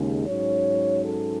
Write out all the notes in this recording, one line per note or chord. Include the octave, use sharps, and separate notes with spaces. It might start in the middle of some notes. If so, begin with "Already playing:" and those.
Already playing: D#2 C#3 G#3
G#2 F#3 C#4 C#5
A4